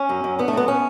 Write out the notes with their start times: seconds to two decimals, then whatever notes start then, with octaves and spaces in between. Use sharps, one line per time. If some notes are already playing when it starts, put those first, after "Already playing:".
Already playing: C#4
0.09 F#2
0.24 F#2
0.39 D3 B3
0.48 A3
0.53 F#3 B3
0.68 C#4